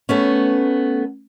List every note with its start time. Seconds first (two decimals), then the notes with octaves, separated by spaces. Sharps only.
0.09 A3 B3 C#4